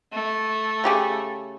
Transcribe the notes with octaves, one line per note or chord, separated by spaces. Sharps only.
A3
C#3 G4 G#4